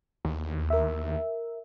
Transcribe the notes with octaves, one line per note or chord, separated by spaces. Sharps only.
D#2
A#4 E5